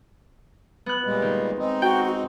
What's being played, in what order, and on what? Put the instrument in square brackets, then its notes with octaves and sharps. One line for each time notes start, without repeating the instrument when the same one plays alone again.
[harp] B3 F#6
[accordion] A#2 G3 G#3
[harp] D#3
[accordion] G#3 C4 D#4
[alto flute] F#4 [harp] G5
[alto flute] F#4